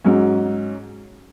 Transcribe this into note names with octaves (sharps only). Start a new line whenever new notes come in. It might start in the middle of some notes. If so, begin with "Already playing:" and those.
G#2 F#3 C#4